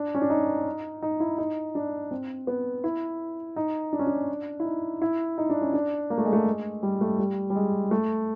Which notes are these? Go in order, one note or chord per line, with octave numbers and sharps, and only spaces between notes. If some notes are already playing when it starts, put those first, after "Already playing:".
Already playing: D4
C#4
D4
D#4
D#4
E4
D#4
D4
C4
B3
E4
D#4
D4
C#4
D4
E4
D#4
E4
D#4
D4
C#4
D4
A#3
A3
G#3
A3
G#3
G3
A3
G3
G3
G#3
A3